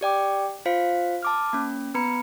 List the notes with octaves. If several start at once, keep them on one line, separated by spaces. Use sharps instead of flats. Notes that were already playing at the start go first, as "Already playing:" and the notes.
G4 D5 G5 D6
F4 C5 F5 B6
A5 D6 F6
A#3 C#4
B3 B4 A#5 B5 C#7